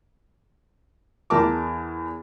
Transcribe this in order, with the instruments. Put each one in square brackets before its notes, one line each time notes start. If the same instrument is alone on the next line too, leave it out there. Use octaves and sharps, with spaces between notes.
[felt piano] E2 A#4 A5 D6